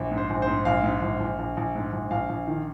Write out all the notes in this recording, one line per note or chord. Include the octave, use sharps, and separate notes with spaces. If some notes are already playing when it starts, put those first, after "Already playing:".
Already playing: A#1
G#2
C5
A#1
C5
G#2
A#1 F5
G#2
A#1
A#1
A#1
A#1
G#2
A#1
A#1 F5
A#1
D#3